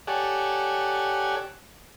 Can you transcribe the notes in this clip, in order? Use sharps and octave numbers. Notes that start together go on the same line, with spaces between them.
G4 A4 C#5 D5 F#5 G#5